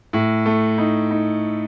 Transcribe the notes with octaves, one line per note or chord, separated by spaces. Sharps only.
A2
A3
D#4
D#4